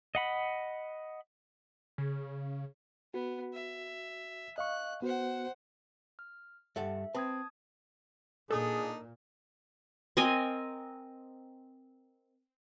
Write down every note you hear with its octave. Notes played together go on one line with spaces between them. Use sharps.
D#5 F#5 B5
C#3
B3 F#4
E5
D#5 F5 C#6 F#6
B3 F#4 C5 F#5
F6
G2 A4 E5 F#5
C4 B4 A5 D#6 G#6
A#2 D4 D#4 G#4 A4
C4 A#4 D#5 G#5